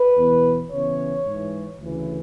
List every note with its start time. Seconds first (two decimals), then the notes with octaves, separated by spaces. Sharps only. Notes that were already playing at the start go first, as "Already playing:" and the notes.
Already playing: B4
0.16 E2 B2
0.71 E2 C#3 E3 C#5
1.25 G#2 E3
1.79 D2 C#3 E3